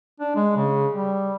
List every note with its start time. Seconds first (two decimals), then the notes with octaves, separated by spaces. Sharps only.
0.20 D4
0.36 G#3
0.56 C#3
0.92 G3